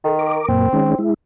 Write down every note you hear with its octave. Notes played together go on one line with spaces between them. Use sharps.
D#3 A4
A#4 D6
F#2 A#2 A#3 C4
D#3 G#3 C#4
G#3 E4